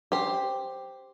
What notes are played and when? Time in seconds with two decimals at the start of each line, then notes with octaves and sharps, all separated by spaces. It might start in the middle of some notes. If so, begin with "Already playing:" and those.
0.12 G4 C5